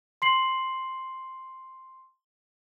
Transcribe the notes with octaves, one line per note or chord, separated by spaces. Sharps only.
C6 C7 F#7